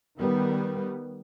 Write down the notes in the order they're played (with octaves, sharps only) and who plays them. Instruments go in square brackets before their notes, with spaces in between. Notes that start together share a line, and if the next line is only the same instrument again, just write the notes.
[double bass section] D#3 G3 B3